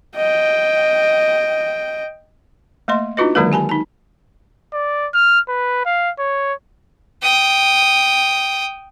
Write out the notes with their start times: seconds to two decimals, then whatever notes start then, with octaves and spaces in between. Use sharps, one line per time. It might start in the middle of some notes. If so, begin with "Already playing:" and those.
0.16 D#5 G5
2.88 A3 A#3 D#5 C6
3.17 D4 D#4 F4 F#4 B4 D#5
3.35 D3 D#3 F#3 G#3 A#3 B4
3.52 G4 G#5 A5 B5
3.69 D#4 A5
4.73 D5
5.14 F6
5.49 B4
5.85 F5
6.19 C#5
7.22 G5 D#6